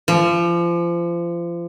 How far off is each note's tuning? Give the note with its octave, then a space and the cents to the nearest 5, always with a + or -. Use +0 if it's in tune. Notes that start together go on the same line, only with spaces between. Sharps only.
F3 -30